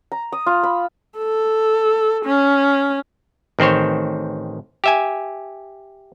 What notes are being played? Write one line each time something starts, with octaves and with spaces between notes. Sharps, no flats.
A#5
D#6
F4
B5
A4
C#4
A1 D#3 C4 C5 C#5
G4 E5 G#5